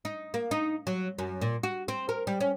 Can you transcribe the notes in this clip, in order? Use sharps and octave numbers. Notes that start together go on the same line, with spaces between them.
D#4
A#3
D#4
F#3
F#2
A#2
F#4
C4
A#4
G3
C#4